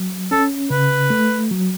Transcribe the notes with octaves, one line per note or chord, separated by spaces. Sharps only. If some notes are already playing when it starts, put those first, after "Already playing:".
Already playing: F#3
C#4 A4
C#3 B4
A3
F#3